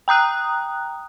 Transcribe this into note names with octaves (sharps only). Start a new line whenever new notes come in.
G5 A#5 D#6 F#6